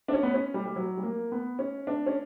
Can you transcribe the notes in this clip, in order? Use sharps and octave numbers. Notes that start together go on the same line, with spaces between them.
D4
C#4
B3
C#4
G3
G3
F#3
G3
A#3
B3
C#4
D4
C#4